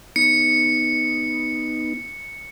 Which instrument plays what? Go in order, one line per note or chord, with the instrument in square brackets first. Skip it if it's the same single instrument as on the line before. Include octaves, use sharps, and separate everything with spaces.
[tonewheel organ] B3 D#4 [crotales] C#7